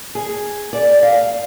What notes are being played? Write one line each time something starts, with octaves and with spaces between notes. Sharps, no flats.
G#4
D5
F5